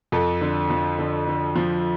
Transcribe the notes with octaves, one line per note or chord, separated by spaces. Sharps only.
F2 A4
D3
F3
D3
D3
F3